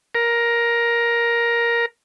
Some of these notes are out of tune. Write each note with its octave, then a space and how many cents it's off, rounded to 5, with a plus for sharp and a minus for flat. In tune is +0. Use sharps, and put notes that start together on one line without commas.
A#4 +10